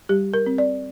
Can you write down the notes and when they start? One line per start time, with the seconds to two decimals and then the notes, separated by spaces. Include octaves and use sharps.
0.09 G3 G4
0.34 A#4
0.46 C4
0.58 D5